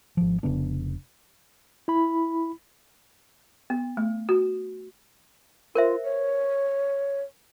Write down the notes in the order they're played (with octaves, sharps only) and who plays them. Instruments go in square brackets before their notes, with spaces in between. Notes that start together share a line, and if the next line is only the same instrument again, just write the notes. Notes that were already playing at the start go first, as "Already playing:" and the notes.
[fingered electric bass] G#1 F3
F1 C#3 B3 D4
[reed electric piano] E4 B5
[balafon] B3
A3
F#4
[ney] F4 [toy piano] A#4 C5 E5
[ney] C#5